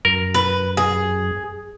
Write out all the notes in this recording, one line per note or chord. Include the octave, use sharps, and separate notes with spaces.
F#2 A#4
B4
G#4